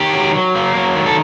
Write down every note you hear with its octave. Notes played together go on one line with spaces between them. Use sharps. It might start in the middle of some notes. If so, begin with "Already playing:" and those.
Already playing: D#3 G4
F#3
F#3
A#3
F#3
D#3
A4